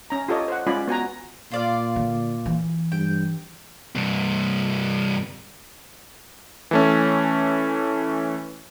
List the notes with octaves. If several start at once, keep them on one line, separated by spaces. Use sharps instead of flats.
C#4 A#5
F4 G4 A4 C#5 D#5
C5 F#5
G#3 C#4 F4 D5 G#5 B5
B3 F#4 G#5 A#5
A#2 F4 D5 F5
D3
E3
G2 G5
G2 C3
E3 A3 C#4